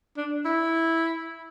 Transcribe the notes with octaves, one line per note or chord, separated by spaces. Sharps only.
D4
E4